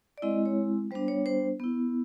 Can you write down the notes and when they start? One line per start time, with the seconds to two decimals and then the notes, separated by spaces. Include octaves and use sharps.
0.18 D5
0.22 G#3 C4 E4 D#5
0.46 C#5
0.91 G3 B3 D4 C5
1.08 C#5
1.26 C5
1.60 B3 E4